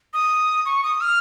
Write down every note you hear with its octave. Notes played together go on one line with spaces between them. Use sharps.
D#6
C#6
D#6
F6